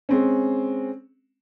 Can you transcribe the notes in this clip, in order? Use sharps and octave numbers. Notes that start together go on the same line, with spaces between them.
G#3 C4 C#4